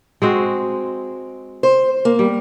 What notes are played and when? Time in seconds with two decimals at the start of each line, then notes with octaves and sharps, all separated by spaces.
0.22 G#3 C4 F#4
1.63 C5
2.05 A#3
2.19 G3